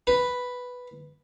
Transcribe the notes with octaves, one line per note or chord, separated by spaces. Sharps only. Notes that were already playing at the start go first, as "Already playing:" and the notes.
B4